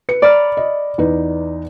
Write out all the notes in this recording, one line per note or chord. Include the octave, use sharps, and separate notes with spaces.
B4 C#7
D5 A#5 B5 F6
D#5
E2 D#4 B4